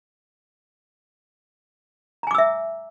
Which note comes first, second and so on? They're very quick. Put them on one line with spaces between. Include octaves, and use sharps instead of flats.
A#5 G#5 D6 E6 E5